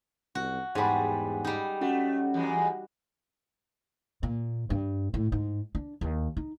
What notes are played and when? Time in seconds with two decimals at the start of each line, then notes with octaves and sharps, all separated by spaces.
0.35 C2 F#4
0.75 E2 G#2 G3 G#4 F#5 B5
1.45 G3 D#4
1.81 A3 C#4 F#4
2.34 E2 E3 G#3
4.23 A#2
4.70 G2
5.14 A2
5.32 G#2
5.75 D4
6.01 D#2
6.37 D#4